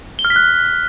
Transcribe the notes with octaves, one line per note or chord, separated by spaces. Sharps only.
G7
F6
B6
F#6